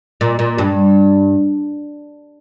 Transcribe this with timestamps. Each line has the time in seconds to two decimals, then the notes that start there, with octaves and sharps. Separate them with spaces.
0.21 A#2
0.39 A#2
0.58 G2